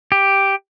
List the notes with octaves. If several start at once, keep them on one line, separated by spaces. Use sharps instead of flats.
G4